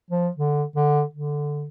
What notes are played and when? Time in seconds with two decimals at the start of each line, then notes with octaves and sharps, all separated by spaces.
0.11 F3
0.37 D3
0.76 D3
1.14 D3